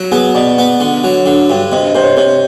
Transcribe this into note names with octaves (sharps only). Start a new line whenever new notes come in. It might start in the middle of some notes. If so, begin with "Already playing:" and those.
Already playing: F#3 F#4
B3 G#4
B2 D5
B3
D3
F#3
D3
G2
C3 D#5
D#5
C3 C5
C#5
C3 C5